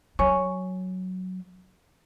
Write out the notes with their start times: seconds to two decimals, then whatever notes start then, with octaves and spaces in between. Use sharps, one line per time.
0.19 F#3 C#5 G#5 C#6